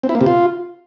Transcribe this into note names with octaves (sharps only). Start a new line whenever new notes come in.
C4
E4
A#3
C3
F4